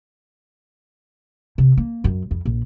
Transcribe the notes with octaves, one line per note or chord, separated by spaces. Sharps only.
C3
A#3
F#2
F2
A#1